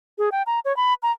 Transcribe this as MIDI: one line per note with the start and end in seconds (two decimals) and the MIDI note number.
0.18 0.29 68
0.32 0.43 79
0.47 0.60 82
0.65 0.75 73
0.77 0.94 83
1.03 1.12 82